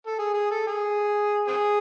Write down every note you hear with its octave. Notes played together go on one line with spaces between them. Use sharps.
A4
G#4
G#4
A4
G#4
C4 G#4